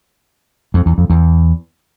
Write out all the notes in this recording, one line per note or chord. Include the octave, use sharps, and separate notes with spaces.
F2
E2
F2
E2